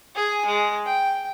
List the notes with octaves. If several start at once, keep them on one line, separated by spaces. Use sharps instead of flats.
G#4 G#5
G#3
G5